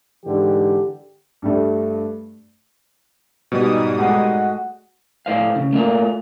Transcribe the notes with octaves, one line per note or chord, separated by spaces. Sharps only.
G#2 D3 E3 G4
G2 G3 A3
G#2 B2 G3 D#6
G#3 A3 F#4
A2 C5 F5
C#3
A3 A#3 F4